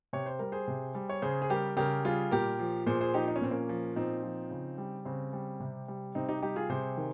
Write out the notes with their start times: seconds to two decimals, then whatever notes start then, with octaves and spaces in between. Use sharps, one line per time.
0.13 C3 C#5
0.26 C5
0.39 G3 A#4
0.52 G#4 C5
0.68 C3
0.95 G3
1.09 C#5
1.22 C#3 G#4 C5
1.42 G#4
1.50 G3 G4 A#4
1.77 C#3 G4 A#4
2.05 G3 F4 G#4
2.31 A#2 G4 A#4
2.59 F3
2.87 A#2 G#4 C5
3.01 G#4 C5
3.14 F3 D#4 G4
3.28 D#4
3.36 C#4
3.41 A#2 C4
3.51 A#3 C#4
3.69 F3
3.96 A#2 C4 D#4
4.23 F3
4.51 C#3
4.78 G3
5.05 C#3 C4
5.33 G3
5.60 C3
5.88 G3
6.15 C3 C4 D#4
6.29 D#4 G4
6.42 G3 D#4 G4
6.56 F4 G#4
6.70 C3 G#4 C5
6.97 D#3